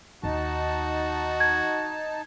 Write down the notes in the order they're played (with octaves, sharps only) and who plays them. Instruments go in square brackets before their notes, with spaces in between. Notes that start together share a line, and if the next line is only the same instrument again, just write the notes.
[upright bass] D#2 [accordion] D#4 A5 [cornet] F#4
[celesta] G#6